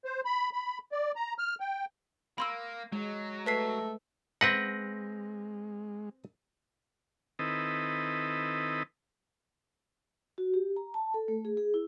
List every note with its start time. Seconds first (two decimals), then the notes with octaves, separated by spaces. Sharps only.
0.05 C5
0.25 B5
0.53 B5
0.92 D5
1.16 A#5
1.38 F6
1.60 G5
2.38 A#3 B5 C6 E6
2.92 F#3 G#3
3.46 A3 B4 B6 C7
4.41 G#3 C4 B4 F#5 A#6
7.39 D#3 C4 E4 A4 B4 D#5
10.38 F#4
10.54 G4
10.76 A#5
10.94 A5
11.14 A4
11.28 A3
11.45 G#4
11.57 G#4
11.74 E4